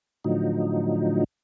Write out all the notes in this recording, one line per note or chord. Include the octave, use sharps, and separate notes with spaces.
A2 D3 F3 F#3 D#4